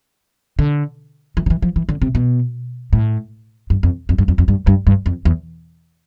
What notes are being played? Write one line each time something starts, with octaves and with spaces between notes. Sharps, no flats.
D3
E3
D3
E3
F3
E3
D3
C3
B2
A2
G2
F2
F2
G2
F2
F2
G2
G2
G2
F2
E2